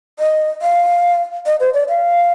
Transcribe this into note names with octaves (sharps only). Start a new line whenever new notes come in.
D#5
F5
D#5
C5
D5
F5